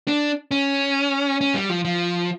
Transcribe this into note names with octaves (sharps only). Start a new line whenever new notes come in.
D4
C#4
C#4
G3
F3
F3